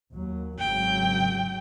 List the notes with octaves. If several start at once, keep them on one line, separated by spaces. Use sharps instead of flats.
D#2 F#3
G#1 C#3 F#3 G5